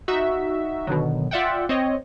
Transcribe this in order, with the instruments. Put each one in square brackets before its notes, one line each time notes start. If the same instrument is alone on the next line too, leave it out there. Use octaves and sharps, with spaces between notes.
[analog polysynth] D#4 F#4 E5
B2 D3 D#3 F#3
F4 D5 E5 F#5 G5
C4 C#5 D#5